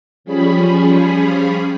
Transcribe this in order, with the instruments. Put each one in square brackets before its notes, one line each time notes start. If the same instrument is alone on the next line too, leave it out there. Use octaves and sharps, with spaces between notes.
[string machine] F3 G3 C#4 G#4 B5